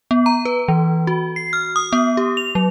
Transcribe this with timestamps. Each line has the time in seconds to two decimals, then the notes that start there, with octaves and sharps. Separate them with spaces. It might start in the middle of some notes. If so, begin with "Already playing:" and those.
0.11 B3
0.26 A#5
0.45 B4
0.68 E3
1.07 F#4
1.36 C7
1.53 F6
1.76 D#6
1.93 B3
2.17 G4
2.37 F7
2.55 F#3